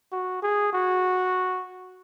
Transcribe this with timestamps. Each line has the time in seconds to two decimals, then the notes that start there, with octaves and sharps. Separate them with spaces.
0.12 F#4
0.42 G#4
0.73 F#4